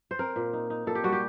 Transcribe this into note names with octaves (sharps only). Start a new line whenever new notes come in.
C5
C4 A#4
A#2
D#4
D#4
A#2 A4
G4
G3 F#4
G4